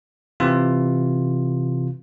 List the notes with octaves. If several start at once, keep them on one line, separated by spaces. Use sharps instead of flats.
C3 E3 F4